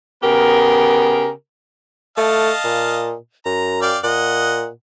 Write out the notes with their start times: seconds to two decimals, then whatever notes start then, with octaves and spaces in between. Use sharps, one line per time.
0.23 C#3 B3 G4 A#4
2.17 A3 D#5 F5 A5
2.64 A#2
3.45 F#2 A#5
3.82 D5 F5 G5
4.04 A#2 D#5 F#5